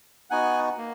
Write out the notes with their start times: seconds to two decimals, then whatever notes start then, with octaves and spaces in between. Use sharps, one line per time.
0.30 B3 D#4 F#4 F#5 G#5
0.78 A#3